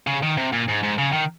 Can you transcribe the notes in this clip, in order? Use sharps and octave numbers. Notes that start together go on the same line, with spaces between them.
C#3
D#3
C3
A#2
G#2
G#2
C#3
D#3